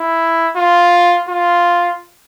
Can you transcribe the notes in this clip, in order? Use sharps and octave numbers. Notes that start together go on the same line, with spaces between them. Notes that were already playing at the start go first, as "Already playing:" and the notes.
Already playing: E4
F4
F4